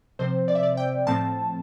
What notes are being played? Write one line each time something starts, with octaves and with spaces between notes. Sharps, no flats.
C3 F3 C4 C5
D5
E5
D5
G5
A2 F3 A3 C4 A5